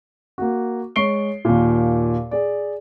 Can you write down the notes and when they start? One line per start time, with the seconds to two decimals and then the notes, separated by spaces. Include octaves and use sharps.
0.38 A#3 F#4
0.96 G#3 C#5 C#6 C7 D7 G7
1.45 D#2 A#2
2.31 G#4 D5